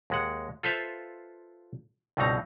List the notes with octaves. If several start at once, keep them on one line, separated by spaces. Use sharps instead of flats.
D#2 G#3 F#5
F4 A4 B4 C5 E5 F5
C#2 G2 B2 C4 D#4 A#5